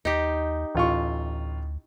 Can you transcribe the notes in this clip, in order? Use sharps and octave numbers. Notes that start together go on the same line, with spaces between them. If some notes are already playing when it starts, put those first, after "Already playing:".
D#2 D#4 G4
A1 D2 F4 C#6